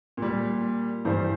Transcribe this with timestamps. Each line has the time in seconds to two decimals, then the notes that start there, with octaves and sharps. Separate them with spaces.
0.17 A#2 G3
1.05 G2 E3 G3 C5
1.19 C5